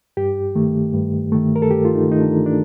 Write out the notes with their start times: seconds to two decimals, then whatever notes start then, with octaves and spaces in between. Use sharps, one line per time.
0.17 G2 G4
0.55 D#3 A3
0.93 G2
1.32 D#3 A3
1.56 A#4
1.62 A4
1.70 G2 G4
1.85 F4
1.95 D#4
2.08 D#3 A3 D#4
2.21 D4
2.46 D4